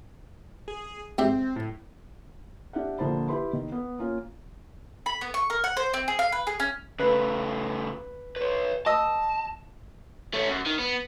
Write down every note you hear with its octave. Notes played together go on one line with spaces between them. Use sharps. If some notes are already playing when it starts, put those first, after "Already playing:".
G#4
G#2 C4 G4 E5
A2
D4 G4 E5 F#5
A#1 D3 A#3 C5 A5 B5
E4 G4 B4 B5 C6
D#3
B3
A#3 C#4 F4
B5
B3
C#6
A#4
F#5
C5
C4
G#4
F5
B4
G#4
C#4
C#3 A3 B4
B4 C#5
D#5 A5 E6
A3 C#4
F#2
D#3
B3